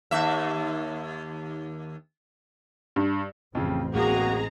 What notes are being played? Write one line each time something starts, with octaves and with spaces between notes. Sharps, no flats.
D#2 E5
G2
A1 F2 C#3 C4
D1 G#3 A#3 F#4 G#4 A#5